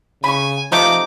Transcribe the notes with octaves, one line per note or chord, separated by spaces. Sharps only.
C#3 G#5 B5 C#6
C3 F3 A3 D#4 D6